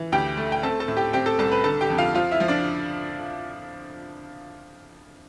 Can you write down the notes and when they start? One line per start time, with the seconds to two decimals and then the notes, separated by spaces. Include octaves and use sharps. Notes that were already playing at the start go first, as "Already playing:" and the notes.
Already playing: E3
0.12 D2 G4 G5
0.37 A3
0.52 G5
0.63 C4 A4 A5
0.80 A4 A5
0.88 A2
0.97 G4 G5
1.13 C4 G4 G5
1.26 A4 A5
1.39 C2 A4 A5
1.52 B4 B5
1.64 D3 A4 A5
1.81 G4 G5
1.90 F2
1.98 F4 F5
2.15 F3 F4 F5
2.31 E4 E5
2.40 F3
2.48 D4 D5